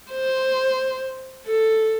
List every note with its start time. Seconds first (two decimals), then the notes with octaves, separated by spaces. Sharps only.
0.11 C5
1.47 A4